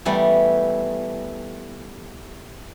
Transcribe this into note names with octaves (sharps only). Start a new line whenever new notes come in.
E3 G3 A3 B3